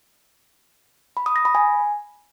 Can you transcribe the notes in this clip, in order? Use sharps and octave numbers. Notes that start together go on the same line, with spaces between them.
B5
D#6
A#6
B5
G#5